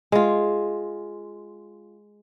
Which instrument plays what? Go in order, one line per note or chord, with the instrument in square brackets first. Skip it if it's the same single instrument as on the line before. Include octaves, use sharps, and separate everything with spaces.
[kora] G#3 F4